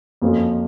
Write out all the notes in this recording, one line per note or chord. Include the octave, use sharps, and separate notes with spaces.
F2 F3 A#3 C#4 F#4